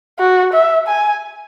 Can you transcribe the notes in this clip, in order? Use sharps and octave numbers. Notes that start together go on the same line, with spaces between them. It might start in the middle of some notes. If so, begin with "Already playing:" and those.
F#4
E5
G#5